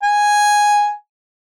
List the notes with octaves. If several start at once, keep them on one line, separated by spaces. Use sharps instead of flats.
G#5